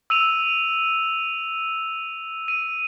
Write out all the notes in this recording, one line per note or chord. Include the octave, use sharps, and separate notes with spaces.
E6 D#7 F7
D#7